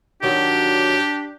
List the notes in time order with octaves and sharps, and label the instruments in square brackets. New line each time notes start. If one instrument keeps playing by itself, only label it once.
[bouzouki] D#3 F#3 [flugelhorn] D4 [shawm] G4